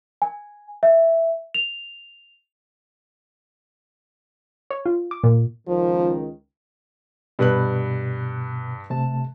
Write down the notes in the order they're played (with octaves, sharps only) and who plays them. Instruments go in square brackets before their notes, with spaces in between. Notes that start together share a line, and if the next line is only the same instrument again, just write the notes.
[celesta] G#5
E5
F7
[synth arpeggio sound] C#5
F4
D6
A#2
[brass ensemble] C#2 D#3 [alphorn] F3
[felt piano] G2 B4 F#6 [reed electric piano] B2
[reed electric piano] C3 A3 A5